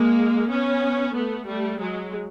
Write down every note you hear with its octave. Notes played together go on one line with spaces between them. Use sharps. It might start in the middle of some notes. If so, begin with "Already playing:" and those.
Already playing: G#3 A#3
B3 C#4
A3 B3
G3 A3
F#3 G#3